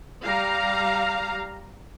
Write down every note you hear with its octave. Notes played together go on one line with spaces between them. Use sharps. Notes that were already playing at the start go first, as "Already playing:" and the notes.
G3 F5 A#5